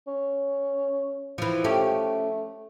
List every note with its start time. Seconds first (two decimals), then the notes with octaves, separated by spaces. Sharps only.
0.07 C#4
1.38 E3 F3
1.64 A3 C#4 G4